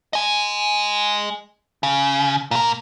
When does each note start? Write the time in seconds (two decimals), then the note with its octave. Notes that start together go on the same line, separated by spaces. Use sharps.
0.13 D#5 G#5
1.83 C#3
2.51 A#2 A#4